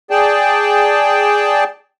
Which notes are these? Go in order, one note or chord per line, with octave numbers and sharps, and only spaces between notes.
G#4 D5 G5 A5